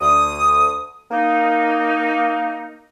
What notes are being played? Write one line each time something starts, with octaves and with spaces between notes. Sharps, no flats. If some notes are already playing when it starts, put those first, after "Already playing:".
D2 D#6
A#3 D#4